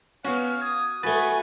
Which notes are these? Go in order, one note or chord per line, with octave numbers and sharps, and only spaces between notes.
B3 C#4 F#4 F5
D#6 G#6
A3 F#4 G#4 B4 G#5 A6